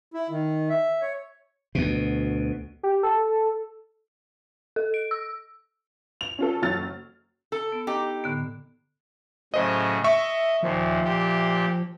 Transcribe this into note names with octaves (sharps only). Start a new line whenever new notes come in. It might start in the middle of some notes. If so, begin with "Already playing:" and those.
E4
D#3
E5
C#5
D2 B2
G4
A4
A4
D7
E6
F7
C#4 F4 A4
F#1 F#3 F6 A6
A4
B3
D#4 G4 D6
A2 D3 B3
A2 C#3 F#3 C5 D#5
D#5 E5 C#6
D#2 A#2 F3
A#2 G4